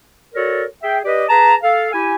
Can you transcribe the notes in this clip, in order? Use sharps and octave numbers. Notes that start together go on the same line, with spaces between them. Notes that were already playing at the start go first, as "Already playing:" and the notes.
F#4 A4 A#4 C#5 D5
G#4 E5 G5
G4 B4 D5 D#5
G#4 B4 A5 A#5
A4 F5
E4 G4 G#5